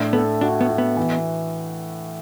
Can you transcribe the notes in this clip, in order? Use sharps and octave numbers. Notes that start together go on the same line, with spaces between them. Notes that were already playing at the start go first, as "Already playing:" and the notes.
Already playing: A2 D4
B3 A4
D4 F#4
B3
F#4
B3
E3